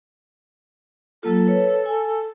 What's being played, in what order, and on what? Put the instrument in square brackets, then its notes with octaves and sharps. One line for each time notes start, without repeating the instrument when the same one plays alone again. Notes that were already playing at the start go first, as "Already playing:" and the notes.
[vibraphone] F#3 A#3 F4 [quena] A4
[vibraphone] B4 C#5
G#5